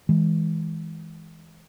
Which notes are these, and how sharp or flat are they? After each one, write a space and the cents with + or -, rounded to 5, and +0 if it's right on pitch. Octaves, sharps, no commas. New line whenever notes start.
E3 -25 G#3 +0